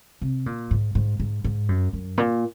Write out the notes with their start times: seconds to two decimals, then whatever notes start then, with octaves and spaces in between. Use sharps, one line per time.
0.21 C3
0.46 A#2
0.71 G#2
0.95 G#2
1.20 G#2
1.44 G#2
1.69 F#2
1.93 F#2
2.18 A#2